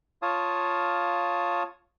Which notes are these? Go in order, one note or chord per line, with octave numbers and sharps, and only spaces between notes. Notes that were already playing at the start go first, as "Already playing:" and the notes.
F4 C#5 F5 A5 D#6